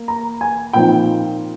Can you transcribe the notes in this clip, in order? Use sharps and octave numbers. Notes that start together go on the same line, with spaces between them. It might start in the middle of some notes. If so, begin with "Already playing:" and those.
Already playing: A#3
A#5
G#5
A#2 F3 C4 D#4 G5